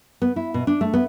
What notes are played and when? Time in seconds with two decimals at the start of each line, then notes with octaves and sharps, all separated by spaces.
0.22 B3
0.36 E4
0.54 B2
0.67 D4
0.81 A3
0.93 B3